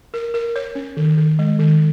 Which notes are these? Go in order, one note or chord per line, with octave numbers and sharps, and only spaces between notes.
A#4
A#4
C#5
C#4
D#3
D#3
G#3
D#3